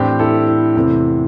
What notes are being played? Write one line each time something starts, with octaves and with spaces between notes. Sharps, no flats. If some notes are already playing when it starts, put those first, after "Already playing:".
Already playing: A2 E3 C4 D4 G4
E4 A4
E4
E2 C3 A3 C4